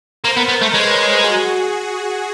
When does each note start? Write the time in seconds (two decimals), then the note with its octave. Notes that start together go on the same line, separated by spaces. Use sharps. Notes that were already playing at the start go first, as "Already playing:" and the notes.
0.24 A#3 A#4 C5
0.37 B3
0.49 B3
0.62 A3
0.74 G#3 B4 C#5
1.24 F#4 G#4